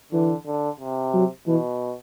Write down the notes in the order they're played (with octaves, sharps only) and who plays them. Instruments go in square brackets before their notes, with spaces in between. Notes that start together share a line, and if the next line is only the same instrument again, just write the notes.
[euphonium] D3 [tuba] E3
[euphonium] D3
C3
[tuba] F#3
[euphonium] B2 [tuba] E3